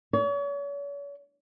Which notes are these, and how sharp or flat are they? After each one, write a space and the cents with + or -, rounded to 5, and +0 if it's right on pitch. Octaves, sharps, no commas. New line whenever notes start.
C#5 +40